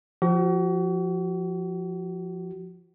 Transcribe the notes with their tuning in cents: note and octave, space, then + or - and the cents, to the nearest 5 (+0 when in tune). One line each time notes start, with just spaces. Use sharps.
F3 +0 F#4 +40